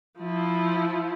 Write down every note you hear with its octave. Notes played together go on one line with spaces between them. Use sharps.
F3 E4